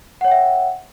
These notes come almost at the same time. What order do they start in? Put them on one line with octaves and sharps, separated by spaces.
F#5 C#5 G5 E5